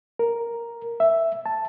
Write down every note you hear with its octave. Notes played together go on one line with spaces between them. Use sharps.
A#4
E5
A5